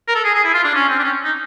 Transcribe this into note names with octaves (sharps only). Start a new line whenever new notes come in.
A#4
A4
G#4
G#4
E4
F4
D4
C#4
C4
D4
C#4
D#4